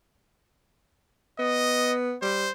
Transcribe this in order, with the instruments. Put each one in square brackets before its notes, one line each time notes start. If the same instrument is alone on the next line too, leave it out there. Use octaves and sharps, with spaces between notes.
[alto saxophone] B3 [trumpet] D#5
[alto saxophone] G3 [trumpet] C5